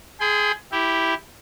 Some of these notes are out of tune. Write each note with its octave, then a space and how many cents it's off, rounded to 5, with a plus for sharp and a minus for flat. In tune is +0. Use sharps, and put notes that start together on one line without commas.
G#4 +15 G5 +35 C6 -30
E4 +0 G4 +0